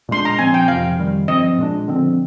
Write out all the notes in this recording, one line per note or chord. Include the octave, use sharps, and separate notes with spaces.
A#2 G#3 D4 C6
A#5
A#2 F3 C4 G#5
G5
F2 C3 F3 F5
F2 D#3 G3
G2 F3 C4 D#5
A#2 G#3 D4
D3 F3 C4